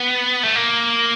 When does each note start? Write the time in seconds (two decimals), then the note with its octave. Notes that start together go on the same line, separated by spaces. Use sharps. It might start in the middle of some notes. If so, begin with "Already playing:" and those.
Already playing: B3
0.43 A3
0.56 A#3